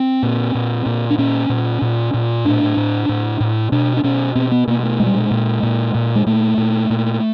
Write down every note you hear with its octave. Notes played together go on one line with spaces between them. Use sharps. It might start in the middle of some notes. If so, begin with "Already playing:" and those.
Already playing: C4
A#2
A#2
A#2
D4
A#2 C#4
A#2
A#2
A#2
A2 D4
A2
A2
A2
B2 D4
D4
B2 C#4
B2 C4
B3
B2 A#3
A3
A#2 G#3
G3
G#3
A#2
A#2
A#2
G#3
A#2 A3
A#2
A#2